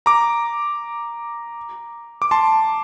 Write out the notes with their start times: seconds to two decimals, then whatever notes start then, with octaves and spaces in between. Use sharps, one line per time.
0.06 A#5 D6
2.22 D6
2.31 A5 C6